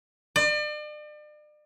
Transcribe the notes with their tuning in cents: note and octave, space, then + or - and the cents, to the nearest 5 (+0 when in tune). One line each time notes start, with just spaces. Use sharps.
D5 +40